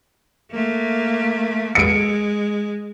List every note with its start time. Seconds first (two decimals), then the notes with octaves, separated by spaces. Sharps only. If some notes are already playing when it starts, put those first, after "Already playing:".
0.51 A3 A#3
1.75 G#3 C#7 D7